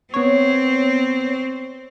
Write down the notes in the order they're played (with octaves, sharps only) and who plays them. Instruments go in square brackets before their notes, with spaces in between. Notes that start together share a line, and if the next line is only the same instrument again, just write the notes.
[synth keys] B3 C#5 [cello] C4